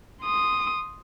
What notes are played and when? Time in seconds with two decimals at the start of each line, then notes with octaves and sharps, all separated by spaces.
0.22 C6 D#6